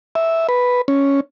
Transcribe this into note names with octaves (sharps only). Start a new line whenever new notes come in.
E5
B4
C#4